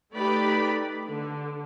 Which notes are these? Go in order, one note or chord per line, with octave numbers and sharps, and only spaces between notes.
A3 D#4 G4 B4 D5 B5
D3